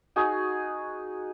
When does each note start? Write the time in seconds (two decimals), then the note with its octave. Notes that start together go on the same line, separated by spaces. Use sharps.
0.16 D#4 F#4 G#4